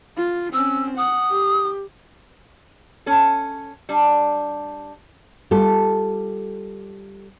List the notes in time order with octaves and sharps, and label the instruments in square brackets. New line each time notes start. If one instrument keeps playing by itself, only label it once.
[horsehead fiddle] F4
[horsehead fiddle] C4 C#4 [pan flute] E6
[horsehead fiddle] F#5 [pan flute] D#6
[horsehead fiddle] G4
[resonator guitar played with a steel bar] C#4 A4
G3 D4
[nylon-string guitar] G3 F4 A4